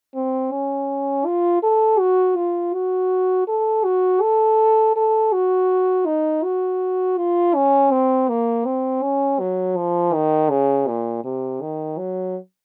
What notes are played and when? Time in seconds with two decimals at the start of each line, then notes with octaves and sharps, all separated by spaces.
0.15 C4
0.52 C#4
1.26 F4
1.63 A4
1.99 F#4
2.37 F4
2.74 F#4
3.48 A4
3.84 F#4
4.22 A4
4.96 A4
5.33 F#4
6.06 D#4
6.44 F#4
7.18 F4
7.55 C#4
7.91 C4
8.29 A#3
8.65 C4
9.02 C#4
9.40 F#3
9.77 F3
10.14 D#3
10.50 C#3
10.87 A#2
11.24 C3
11.62 D#3
11.98 F#3